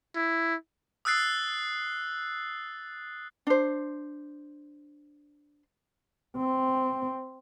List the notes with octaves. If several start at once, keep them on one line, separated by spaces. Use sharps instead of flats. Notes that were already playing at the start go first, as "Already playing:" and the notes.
E4
D#6 E6 F#6 A6 C7
D4 C5
C4